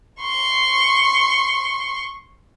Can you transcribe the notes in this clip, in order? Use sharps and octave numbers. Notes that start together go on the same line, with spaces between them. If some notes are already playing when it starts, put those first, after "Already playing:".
C6 C#6